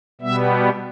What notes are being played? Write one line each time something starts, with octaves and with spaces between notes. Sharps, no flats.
B2 G3 B3 E5